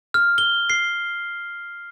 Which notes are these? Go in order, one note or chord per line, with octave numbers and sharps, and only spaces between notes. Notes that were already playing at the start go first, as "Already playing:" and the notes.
F6
G7
C7